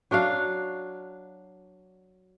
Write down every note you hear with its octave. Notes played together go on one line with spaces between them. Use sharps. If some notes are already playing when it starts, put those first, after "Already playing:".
F#3 D4 F#4 F5